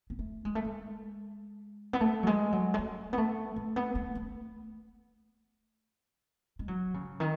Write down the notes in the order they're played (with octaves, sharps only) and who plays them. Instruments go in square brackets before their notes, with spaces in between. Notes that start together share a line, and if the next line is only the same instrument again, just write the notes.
[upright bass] B3
A3
G#3
A3
G#3
B3
A3
F#3
G#3
F#3
G#3
A3
B3
A3
A3
B3
A3
A3
G#3
F#3
C#3
D#3